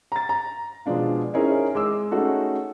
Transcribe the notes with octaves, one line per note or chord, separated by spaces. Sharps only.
A#5 A6
A#5
B2 F3 G#3 D4 F4
C4 C#4 D#4 E4 G#4 A#4
G#3 D6 E6
A3 C#4 D#4 F#4 G#4 A4